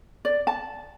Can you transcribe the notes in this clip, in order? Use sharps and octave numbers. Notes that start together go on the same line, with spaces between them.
D5
A5